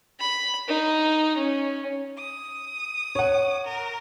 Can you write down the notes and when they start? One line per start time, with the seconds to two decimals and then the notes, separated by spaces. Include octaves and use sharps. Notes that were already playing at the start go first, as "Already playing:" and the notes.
0.20 B5
0.68 D#4
1.37 C#4
2.18 D#6
3.15 C#5 F#5
3.65 A#4